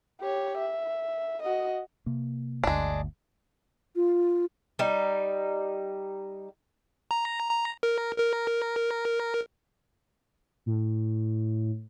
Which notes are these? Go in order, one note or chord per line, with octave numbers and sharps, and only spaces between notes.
G4 C#5
E5
F#4 D#5
C3 A#3
G1 D2 G#3 D4
F4
G3 D#4
A#5
A#5
A#4
A#4
A2